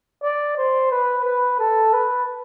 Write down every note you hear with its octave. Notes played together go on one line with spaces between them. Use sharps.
D5
C5
B4
B4
A4
B4